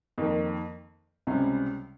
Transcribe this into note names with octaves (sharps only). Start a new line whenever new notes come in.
F2 D#3 A#3
C#2 C3 G3 C#4